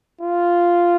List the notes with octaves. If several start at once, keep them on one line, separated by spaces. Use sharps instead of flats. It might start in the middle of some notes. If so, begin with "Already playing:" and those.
F4